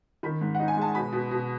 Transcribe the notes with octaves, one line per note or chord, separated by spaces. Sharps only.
D#3 B5
G#2
D#4 F#5
G#5
G#3 A5
B2 B5
B2
B2